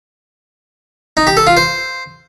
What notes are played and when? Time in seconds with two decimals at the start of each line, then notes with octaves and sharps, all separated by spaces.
1.17 D#4
1.27 G4
1.37 A4
1.47 F4
1.57 C5